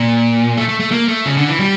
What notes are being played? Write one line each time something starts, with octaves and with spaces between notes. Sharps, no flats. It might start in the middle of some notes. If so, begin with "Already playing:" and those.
Already playing: A#2
A3
A3
A3
A#3
A3
C#3
D3
E3
G3